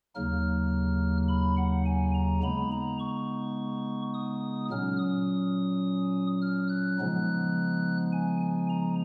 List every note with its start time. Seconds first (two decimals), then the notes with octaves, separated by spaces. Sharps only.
0.15 D#2 C#3 F#3 A#3 D#4 F6
1.29 B5
1.57 F#5
1.85 G#5
2.14 A#5
2.43 C#3 G#3 B3 D#4 B5
2.72 A#5
3.00 C#6
4.14 D#6
4.70 A#2 F#3 C#4 F6
4.99 D#6
6.42 F6
6.69 F#6
6.98 C#3 F3 G#3 B3 D#4
8.12 G#5
8.41 G#5
8.69 A#5